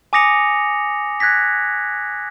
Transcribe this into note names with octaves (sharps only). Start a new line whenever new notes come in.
G#5 D6 D#6 A#6 C#7 F7
F#6 G#6 A#6 B6